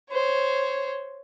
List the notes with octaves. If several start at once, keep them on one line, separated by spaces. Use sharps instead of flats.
C5 C#5